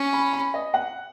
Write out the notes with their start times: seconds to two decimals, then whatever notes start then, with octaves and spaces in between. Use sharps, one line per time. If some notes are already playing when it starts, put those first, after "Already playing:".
Already playing: C#4
0.13 B5
0.33 B5
0.54 D#5
0.74 F#5